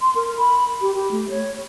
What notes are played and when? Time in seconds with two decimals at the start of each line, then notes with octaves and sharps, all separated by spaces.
0.02 C6
0.16 A#4
0.38 B5
0.81 G4
0.95 G4
1.11 A3
1.30 C#5